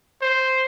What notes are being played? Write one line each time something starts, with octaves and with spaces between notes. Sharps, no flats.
C5